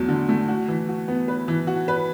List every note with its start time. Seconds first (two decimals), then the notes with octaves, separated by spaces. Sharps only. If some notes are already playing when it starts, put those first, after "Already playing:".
Already playing: E2 F#3 A3
0.08 D3
0.29 A3
0.48 F#4
0.68 E3
0.89 F#4
1.08 B3
1.28 B4
1.48 E3
1.67 F#4
1.88 B4